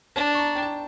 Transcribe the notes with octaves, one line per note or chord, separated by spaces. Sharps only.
D4 A5
C#6
A#5
G5
A5